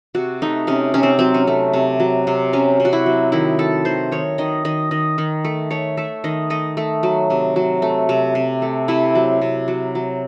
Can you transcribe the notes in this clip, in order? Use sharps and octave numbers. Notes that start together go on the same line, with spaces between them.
C3 F#4
A3 D#4
C3 C#4
C3 C#4
C4
F#3 C4
C#4
A3
C3
F#3
C3
F#3 C#4
C3
F#4
E4
F#3
D#3 E4
A3 A4
D#3 C5
D#3 C#5
D#3 D#5
D#3 D#5
D#3 D#5
D#3
A3
A3 C#5
A3 E5
D#3 D#5
A3 D#5
A3
F#3
C3
F#3
A3
C3
C3
A3
C3 E4
F#3
C3
F#3
F#3